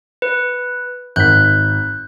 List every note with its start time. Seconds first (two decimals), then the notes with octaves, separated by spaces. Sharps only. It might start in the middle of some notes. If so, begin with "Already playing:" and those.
0.22 B4
1.16 G#1 F#6 G6 B6